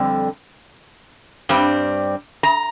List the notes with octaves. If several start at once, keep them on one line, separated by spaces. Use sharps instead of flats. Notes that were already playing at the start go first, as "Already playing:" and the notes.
Already playing: F2 D3 G3 C4
G2 G3 C4
A#5